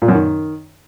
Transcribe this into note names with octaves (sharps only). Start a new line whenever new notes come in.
A#2
F#2
D#3